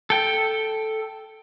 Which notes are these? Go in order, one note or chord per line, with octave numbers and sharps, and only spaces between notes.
A4 G5